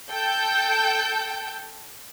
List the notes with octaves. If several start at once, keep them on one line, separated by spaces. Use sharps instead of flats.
A4 G5 G6